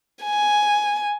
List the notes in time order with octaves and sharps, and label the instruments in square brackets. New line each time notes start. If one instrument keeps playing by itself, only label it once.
[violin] G#5